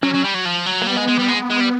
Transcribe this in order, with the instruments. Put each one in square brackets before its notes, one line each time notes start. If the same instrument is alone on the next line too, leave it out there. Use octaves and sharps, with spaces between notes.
[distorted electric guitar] F#3 [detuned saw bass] C#4
[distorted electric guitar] F#3
G3
F#3
F3
F#3
[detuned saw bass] A#3
[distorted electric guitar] G3 [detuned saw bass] B3
[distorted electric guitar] G#3
G#3
G3
G#3
G#3
G3